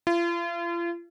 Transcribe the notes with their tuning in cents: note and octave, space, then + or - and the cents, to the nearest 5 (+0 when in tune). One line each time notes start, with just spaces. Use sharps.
F4 -40